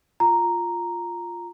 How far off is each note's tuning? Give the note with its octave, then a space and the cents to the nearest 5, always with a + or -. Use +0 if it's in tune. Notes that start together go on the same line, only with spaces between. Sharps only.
F4 +0 A#5 +0